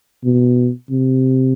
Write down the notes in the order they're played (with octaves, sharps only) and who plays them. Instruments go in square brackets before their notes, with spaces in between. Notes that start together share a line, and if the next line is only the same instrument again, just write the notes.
[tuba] B2
C3